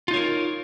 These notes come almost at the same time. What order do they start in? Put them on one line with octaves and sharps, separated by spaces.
F4 D#4 C#5 A#4